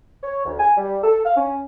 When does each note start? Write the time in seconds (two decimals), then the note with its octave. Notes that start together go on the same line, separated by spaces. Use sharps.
0.23 C#5
0.45 D2
0.59 G#5
0.77 G3
1.03 A4
1.25 F5
1.37 C#4